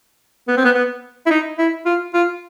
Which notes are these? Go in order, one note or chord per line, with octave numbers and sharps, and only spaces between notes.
B3
C4
B3
B3
E4
D#4
E4
F4
F4